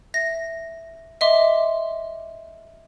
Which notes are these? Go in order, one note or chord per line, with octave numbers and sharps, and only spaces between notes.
E5 A#6
D#5 E5 C6 D6